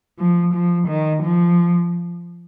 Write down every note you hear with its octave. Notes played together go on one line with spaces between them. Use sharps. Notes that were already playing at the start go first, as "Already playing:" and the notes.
F3
F3
D#3
F3